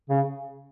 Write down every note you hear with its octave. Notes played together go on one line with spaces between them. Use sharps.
C#3